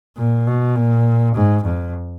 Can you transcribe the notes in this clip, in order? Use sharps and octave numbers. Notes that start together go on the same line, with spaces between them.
A#2
B2
A#2
G#2
F2